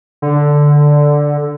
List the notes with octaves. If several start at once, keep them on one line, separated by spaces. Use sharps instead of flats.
D3